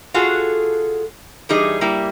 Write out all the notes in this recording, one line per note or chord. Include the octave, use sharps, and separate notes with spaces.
F4 F#4 G#4 A4
E3 G3 D#4 G#4
G3 A#3 E4